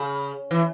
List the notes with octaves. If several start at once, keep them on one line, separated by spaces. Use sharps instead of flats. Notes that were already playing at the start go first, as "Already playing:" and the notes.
Already playing: C#3
E3